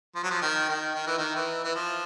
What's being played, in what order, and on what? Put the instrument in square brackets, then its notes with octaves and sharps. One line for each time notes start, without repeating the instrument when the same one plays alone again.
[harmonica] F3
F#3
F3
D#3
D#3
D#3
E3
D#3
E3
E3
F3